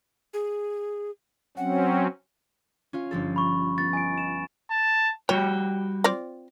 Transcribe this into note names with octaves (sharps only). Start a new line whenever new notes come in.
G#4
F#3 C4 C#4 F#5
C#4 F4 F5
G1 F3 A4
B5 C#6
B3 A6
D#5 G#5 D7
E7
A5
G3 F#4 C#5 G5
C4 F4 D5